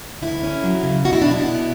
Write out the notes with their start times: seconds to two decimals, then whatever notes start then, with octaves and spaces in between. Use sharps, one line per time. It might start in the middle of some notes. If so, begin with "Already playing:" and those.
0.22 D2 E4
0.43 C#4
0.64 F#3
0.83 C#3
1.05 B2 F#4
1.13 E4
1.22 D4
1.26 B2
1.31 E4
1.46 B3